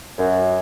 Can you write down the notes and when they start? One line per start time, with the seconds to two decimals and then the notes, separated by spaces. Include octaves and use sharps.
0.18 F#2